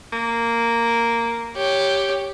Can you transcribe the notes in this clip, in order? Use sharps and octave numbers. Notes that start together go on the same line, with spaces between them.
A#3
G4 C#5